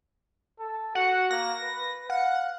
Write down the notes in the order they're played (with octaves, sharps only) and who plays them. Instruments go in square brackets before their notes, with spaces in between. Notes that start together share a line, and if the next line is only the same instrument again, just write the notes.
[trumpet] A4
[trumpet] F#4 [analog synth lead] F#5
[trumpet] A#3 [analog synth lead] A#6
[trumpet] B4
[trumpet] F5 [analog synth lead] F#5